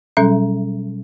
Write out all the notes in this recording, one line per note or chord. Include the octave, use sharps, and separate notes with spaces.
B2 F#3 G3 C#4 A4 E5